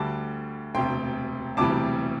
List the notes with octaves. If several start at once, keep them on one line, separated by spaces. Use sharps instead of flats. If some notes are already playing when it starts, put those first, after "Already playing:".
Already playing: D2 D3 G3 A5 D6
E1 D2 C3 G5 C6
E1 D2 C3 E3 G3 A5 D6